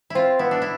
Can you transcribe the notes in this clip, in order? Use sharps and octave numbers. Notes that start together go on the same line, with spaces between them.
C4 E4 F4
B3 E4
D4
E4